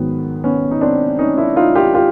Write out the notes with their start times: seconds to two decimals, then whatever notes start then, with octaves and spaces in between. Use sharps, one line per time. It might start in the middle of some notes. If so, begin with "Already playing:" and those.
Already playing: G#2 D#3 F#3 B3
0.44 B3 C#4
0.71 D#4
0.81 C4 D4
1.19 C#4 D#4
1.38 D4 E4
1.56 D#4 F4
1.75 F4 G4
1.94 F4 G4